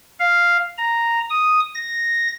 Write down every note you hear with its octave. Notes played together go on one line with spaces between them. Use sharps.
F5
A#5
D#6
A#6